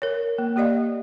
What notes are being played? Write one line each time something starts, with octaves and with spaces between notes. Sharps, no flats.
A#4 C#5
A#3
A#3 G4 D5 D#5 F5